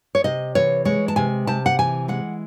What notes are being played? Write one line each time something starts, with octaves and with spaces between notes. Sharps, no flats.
C#5
C3 D#5
E3 C#5
G#3 C#5
A5
C3 G#5
C3 A5
F#5
E3 G#5
G#3 F#5